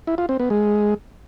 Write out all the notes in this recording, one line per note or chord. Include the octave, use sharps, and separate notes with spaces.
E4
F4
C4
B3
G#3